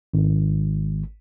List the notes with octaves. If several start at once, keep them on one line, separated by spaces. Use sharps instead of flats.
G#1